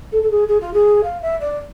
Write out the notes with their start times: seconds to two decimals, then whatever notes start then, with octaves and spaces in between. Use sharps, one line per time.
0.12 A4
0.23 A4
0.30 G#4
0.48 G#4
0.61 F4
0.74 G#4
1.04 F5
1.22 E5
1.40 D5